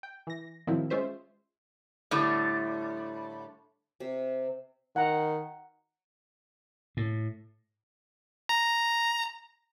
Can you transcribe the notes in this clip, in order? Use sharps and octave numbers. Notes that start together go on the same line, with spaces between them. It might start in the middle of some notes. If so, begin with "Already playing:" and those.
G5
E3 A#6
A2 D#3 F3 F#3 C4 E4
G#3 C#4 F4 C5 E5
A2 D3 G3 A3
C3
D#3 F#5 A#5
A2
A#5